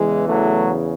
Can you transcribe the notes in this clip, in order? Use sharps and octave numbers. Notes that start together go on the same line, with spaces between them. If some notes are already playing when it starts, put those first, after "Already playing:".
Already playing: E2 C#3 E3 G#3
F#3 A3